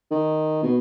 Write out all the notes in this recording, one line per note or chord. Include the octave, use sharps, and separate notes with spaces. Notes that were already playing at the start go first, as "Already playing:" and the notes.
D#3
B2